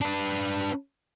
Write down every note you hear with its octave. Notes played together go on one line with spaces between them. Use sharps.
D4 B4